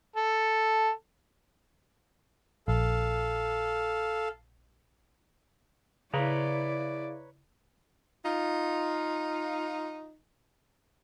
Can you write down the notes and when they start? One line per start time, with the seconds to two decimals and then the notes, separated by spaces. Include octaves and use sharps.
0.16 A4
2.68 A#1 A4 F5
6.14 C#3 E4 B4 C#5 D5 A#5
8.24 D#4 F4